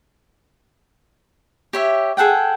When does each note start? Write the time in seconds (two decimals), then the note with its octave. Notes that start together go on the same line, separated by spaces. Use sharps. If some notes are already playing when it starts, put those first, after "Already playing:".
1.73 G4 C#5 E5
2.17 G#4 A4 F#5 G5